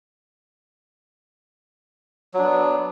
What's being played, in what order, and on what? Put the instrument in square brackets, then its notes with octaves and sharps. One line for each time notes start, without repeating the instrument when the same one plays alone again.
[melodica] F#3
D4
B3